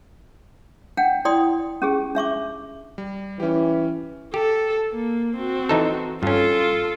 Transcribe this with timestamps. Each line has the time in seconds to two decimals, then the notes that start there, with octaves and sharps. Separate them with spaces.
0.97 D4 F#5 G5
1.25 E4 D5 G5 C6 D#6
1.82 C#4 G4 G#4
2.15 D4 E5 C#6 D6
2.98 G3
3.40 E3 C#4 G4
4.34 G4 A4
4.93 A#3
5.37 C4 F#4
5.69 E3 D#4 A4
6.23 G2 C#4 F4 A4